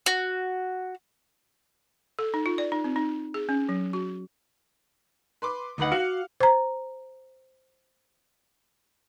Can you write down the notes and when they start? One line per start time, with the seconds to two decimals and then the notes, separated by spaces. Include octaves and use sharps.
0.06 F#4
2.19 A4
2.34 D#4
2.46 F4
2.58 D5
2.72 D#4
2.84 C4
2.96 D#4
3.34 G#4
3.49 C#4
3.69 F#3
3.93 F#4
5.42 B4 C6 D6
5.78 D2 D#4 B4 D#5 F#5
5.92 F#4 F5
6.40 C5 A#5